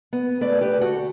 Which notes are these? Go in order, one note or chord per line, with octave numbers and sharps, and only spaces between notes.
B3
A3 B4 D5
G4 B4
D2
F#4 A4